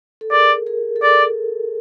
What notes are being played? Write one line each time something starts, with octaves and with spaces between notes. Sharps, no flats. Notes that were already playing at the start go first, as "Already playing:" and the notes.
A4
G#4 A#4 D5
G#4 A#4
A4
G#4 A#4 D5